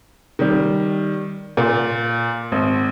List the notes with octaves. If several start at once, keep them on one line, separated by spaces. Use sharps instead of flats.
D#3 G3
A#2
G#1